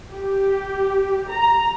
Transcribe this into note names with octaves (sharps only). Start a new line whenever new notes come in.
G4
A#5